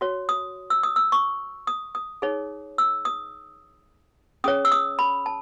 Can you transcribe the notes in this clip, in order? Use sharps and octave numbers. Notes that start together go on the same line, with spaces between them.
F#4 C#5
D#6
E6
D#6
E6
C#6
D#6
D#6
D#4 G#4 C#5
E6
D#6
C#4 G#4 C#5 D#6
E6
D#6
B5
A5